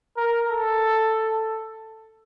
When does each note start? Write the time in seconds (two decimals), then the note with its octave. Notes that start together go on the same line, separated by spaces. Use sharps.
0.17 A#4
0.49 A4